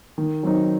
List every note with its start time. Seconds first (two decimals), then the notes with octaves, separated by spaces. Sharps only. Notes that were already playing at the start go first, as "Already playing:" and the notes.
0.18 D#3
0.43 F#3 C4 D#4